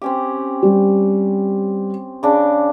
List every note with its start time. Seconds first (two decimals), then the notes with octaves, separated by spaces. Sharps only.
0.02 C4 C#4 G4
0.63 G3
2.23 C#3 D4